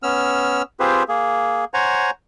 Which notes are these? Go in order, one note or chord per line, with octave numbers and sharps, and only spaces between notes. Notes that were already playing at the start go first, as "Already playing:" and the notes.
B3 C#4 E6 F6
C4 F4 G4 G#4 B4 C5
A#3 G#4
C5 C#5 F#5 G#5 A#5